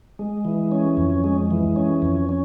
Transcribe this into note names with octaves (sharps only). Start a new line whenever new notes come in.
G#3
E3
C#4
F2
G#3
E3
C#4
F2
C#4